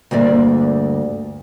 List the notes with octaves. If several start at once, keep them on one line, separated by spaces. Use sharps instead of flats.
D2 G2 A#3 D5 E5